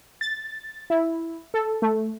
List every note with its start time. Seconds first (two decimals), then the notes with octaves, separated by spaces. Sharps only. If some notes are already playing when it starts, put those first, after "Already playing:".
0.21 A6
0.90 E4
1.54 A4
1.82 A3